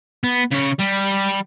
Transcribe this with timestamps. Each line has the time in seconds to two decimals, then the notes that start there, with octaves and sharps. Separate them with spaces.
0.24 B3
0.52 C#3 C#5
0.79 G3